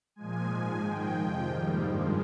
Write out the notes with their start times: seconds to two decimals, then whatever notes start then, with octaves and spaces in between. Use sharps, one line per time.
0.15 A#2 F3 G#3 G#5
0.49 G#2 F3 G#3 G#5
0.82 G#2 D#3 G#3 G5
1.15 F2 C3 F3 G5
1.49 G#2 D#3 G3 A#3
1.82 G2 F3 G#3